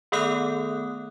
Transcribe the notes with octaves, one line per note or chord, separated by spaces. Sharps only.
D#3 A3 B3 A4 D#6 F#6